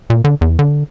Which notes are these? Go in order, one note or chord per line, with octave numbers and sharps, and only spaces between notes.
A#2
D3
E2
D3